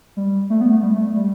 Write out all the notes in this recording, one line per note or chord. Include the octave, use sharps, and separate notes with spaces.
G3
A3
B3
A3
G3
A3
G3